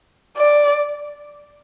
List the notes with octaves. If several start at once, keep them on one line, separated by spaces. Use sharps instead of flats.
D5